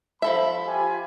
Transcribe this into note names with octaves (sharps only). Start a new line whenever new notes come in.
F3 A4 E5 B5
F4 G4 G#5